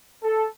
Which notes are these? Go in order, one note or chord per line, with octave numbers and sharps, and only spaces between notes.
A4